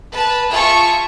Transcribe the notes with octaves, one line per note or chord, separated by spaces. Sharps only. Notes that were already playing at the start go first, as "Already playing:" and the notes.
B4 A5
F4 G#4 E5 A5 C#6